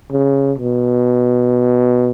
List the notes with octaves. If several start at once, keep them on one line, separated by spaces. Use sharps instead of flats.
C#3
B2